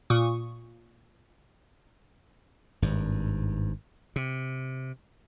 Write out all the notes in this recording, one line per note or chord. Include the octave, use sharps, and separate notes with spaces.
A#2 C#6 D#6
G#1 G2
C3